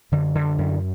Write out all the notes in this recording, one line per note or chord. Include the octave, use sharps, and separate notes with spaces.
F#2 D3
D3
F#2